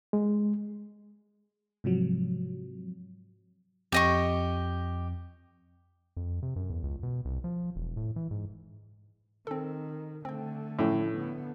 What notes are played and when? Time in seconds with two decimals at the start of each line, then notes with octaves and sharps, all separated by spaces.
0.13 G#3
1.84 G#2 C3 F3 F#3
3.92 F2 G4 D#5 C#6
6.17 F2
6.43 C3
6.56 F#2
6.70 E2
6.84 C#2
7.03 B2
7.25 C2
7.44 F3
7.76 E1
7.97 A2
8.16 E3
8.31 G#2
9.47 D#3 C4 A4
10.25 D3 A3 C4 G5
10.79 A2 F3 C#4
11.12 D3 B3